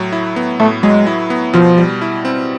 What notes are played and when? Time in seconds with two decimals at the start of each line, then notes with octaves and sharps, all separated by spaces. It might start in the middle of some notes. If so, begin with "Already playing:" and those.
Already playing: A2 F#3
0.13 E4
0.36 B3
0.60 A2 A3
0.83 F#3 G#3
1.07 E4
1.30 B3
1.53 B2 F3
1.78 G3
2.02 E4
2.25 C4